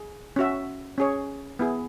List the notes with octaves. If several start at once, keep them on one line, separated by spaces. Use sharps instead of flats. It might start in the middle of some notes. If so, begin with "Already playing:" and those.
Already playing: G#4
C#4 F#4 E5
C#4 G#4 C#5
B3 E4 G#4